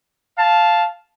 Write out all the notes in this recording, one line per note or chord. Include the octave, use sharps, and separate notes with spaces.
F5 A5